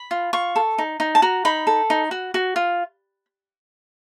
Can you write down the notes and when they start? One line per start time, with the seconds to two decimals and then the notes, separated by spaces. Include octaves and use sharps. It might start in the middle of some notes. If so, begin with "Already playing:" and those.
Already playing: B5
0.11 F4
0.33 F4 C#6
0.56 A4
0.78 D#4
1.00 D#4
1.15 A5
1.22 F#4 A#5
1.45 D#4 B5
1.67 A4
1.90 D#4
2.11 F#4
2.34 F#4
2.56 F4